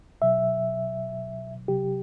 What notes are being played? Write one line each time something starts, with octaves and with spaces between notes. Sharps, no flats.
B2 F#3 E5
C3 F#3 G4